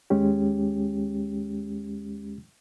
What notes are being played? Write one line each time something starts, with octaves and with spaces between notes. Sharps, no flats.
D#2 G#3 C#4 G4